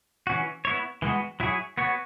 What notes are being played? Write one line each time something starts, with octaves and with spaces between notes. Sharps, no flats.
E3 C#4 F#4
B3 E4 C#5
E3 G#3 B3 F#4
F#3 E4 G#4 C#5
B3 F#4 C#5